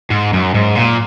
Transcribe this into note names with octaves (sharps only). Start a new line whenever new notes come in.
G#2
F#2
G#2
A#2